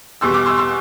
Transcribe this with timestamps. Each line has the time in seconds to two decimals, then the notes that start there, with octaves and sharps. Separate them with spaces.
0.21 E2 B2 G3 C6 E6
0.34 D6 F6
0.46 C6 E6
0.58 C6 E6